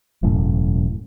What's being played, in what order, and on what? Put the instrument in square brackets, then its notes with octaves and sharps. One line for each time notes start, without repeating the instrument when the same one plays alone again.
[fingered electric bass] E1 F#2 A2